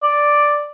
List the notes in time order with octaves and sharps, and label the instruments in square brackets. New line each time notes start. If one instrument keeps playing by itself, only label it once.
[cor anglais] D5